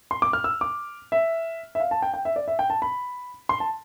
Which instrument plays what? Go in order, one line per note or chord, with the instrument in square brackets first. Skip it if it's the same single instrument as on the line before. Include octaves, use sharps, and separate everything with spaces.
[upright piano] C6
D6
F6
E6
D6
E5
E5
F5
A5
G5
G5
E5
D5
E5
G5
A5
B5
C6
A5